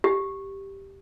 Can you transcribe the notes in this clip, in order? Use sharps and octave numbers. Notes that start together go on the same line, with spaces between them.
G4